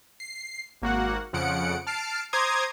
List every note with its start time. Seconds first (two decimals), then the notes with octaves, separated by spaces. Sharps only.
0.20 C7
0.82 G#1 A#3 F#4 F#5
1.33 F2 C#3 F3 F#5 C#7 D7
1.87 A5 F6 C7 D7
2.33 C5 A#5 C6 D6 D#6 G#6